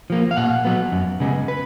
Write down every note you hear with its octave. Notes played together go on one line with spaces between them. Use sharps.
F3 A#3
F5
A#2 F#5
F#3 B3
F#2
C#3 G#3 B3
B4